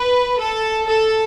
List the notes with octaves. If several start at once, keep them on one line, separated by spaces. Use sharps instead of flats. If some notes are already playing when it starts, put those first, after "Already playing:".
Already playing: B4
A4
A4